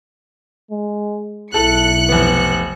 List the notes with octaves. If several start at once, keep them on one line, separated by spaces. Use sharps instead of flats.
G#3
B1 E4 A4 F#6 C#7
F1 B3